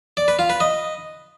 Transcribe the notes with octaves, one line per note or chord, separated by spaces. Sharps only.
D5
B4
F4
B4
D#5